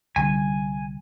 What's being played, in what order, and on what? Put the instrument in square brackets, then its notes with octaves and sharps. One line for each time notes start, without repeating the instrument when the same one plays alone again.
[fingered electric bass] C2 D3 G3 [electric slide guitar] G#5